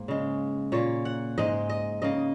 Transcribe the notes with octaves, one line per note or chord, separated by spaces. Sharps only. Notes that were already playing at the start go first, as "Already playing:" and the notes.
Already playing: G#2 A#3
C#3 G#3
A#2 A#3 C#5
F#5
G#2 G#3 D#5
D#5
C#3 A#3 D#5